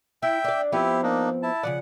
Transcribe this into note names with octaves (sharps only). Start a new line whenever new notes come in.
E4 E5 G5
D4 D5
F3 B3 C4 E4 G4
A#3 D4 D#4
E4 A5
C#3 F3 D5 F#5